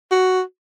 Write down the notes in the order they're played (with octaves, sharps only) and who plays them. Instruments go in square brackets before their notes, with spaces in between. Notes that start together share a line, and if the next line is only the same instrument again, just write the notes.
[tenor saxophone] F#4